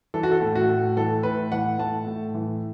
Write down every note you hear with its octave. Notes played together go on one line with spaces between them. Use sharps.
E3 A4
F#4
A4
A2
F#4
A2
E3 A4
A2 B4
E3 F#5
A2 A5
A2
E3